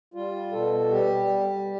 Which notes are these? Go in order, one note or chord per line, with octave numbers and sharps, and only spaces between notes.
G3 F4
B2 A4
G3 G4
G3